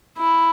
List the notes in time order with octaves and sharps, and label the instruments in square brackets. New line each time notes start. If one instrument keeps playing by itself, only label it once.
[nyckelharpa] E4